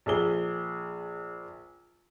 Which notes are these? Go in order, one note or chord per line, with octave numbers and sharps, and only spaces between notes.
A#1 G#4 G7